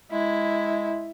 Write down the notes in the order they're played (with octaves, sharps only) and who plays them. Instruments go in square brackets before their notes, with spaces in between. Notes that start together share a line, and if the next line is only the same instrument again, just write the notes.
[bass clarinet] G#3 [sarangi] E4